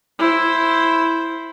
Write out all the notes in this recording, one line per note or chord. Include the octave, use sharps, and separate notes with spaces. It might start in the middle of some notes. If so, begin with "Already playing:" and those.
E4 C5